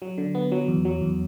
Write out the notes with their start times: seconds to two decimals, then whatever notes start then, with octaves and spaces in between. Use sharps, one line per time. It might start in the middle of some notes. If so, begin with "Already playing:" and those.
0.02 F#3
0.18 D3
0.35 B3
0.52 F#3
0.68 E2
0.85 F#3
1.01 E2